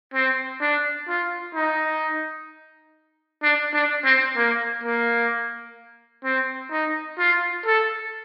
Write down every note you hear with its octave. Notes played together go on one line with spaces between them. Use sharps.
C4
D4
F4
D#4
D4
D4
C4
A#3
A#3
C4
D#4
F4
A4